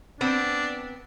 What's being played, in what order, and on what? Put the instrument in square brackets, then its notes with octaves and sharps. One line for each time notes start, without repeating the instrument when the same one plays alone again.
[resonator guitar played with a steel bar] B3 C4 [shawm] D4